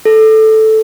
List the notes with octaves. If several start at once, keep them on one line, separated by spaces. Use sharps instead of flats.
A4